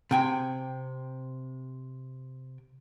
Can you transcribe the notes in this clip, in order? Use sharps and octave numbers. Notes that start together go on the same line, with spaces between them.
C3 G5 G#5